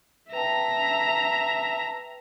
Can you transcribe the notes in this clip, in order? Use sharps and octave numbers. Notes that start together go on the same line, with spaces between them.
B4 E5 G5 A5 A#5